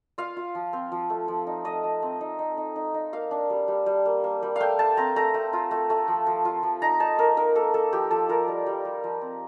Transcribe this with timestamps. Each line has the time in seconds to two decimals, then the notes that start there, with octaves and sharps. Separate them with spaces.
0.18 F4 F5
0.36 F4
0.55 F3
0.73 C4
0.92 F3
1.10 A3
1.28 F3
1.47 D#4
1.65 A3 D#5
1.84 A3
2.02 C4
2.21 D#4
2.39 D#4
2.57 D#4
2.76 D#4
2.94 D#4
3.13 A#3 F5
3.31 D4
3.50 G3
3.68 G3
3.86 G3
4.05 A#3
4.24 A#3
4.43 G3
4.56 A3 F5 G5
4.79 A3 A5
4.97 C4 A#5
5.16 A3 A#5
5.34 A3
5.53 F4
5.71 A3
5.90 A3
6.08 F3
6.27 F3
6.45 F4
6.63 F3
6.82 D#4 A#5
7.00 D#4 A5
7.18 A#3 A#4
7.37 D#4 A#4
7.55 A#3 A4
7.74 A#3 A4
7.93 F3 G4
8.11 F3 A4
8.29 F4 A#4
8.48 G3
8.66 G3
8.85 G3
9.04 F3
9.21 C4